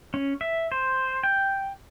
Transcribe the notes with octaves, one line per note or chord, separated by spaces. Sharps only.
C#4
E5
C5
G5